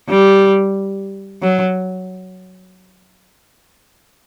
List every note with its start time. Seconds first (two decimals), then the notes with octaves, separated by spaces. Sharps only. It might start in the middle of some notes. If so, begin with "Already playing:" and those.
0.10 G3
1.42 F#3